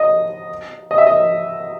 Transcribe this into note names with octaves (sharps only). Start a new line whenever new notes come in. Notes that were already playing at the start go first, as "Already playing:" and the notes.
Already playing: D#5
D#5
E5
D#5